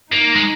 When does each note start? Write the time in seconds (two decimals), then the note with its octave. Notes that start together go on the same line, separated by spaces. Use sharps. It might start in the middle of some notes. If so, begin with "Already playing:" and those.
0.12 A#3 D#4
0.36 G#3